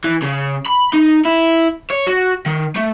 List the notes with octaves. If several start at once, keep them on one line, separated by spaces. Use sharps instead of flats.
E3
C#3
B5
D#4
E4
C#5
F#4
D#3
A3